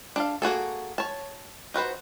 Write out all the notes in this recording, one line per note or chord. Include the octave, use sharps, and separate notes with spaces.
D4 A4 F5
A#3 F#4 G#4 A4
C#5 A5
D#4 F#4 B4 C5